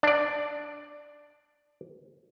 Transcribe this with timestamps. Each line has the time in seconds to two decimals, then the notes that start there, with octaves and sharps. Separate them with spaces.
0.03 D4 D5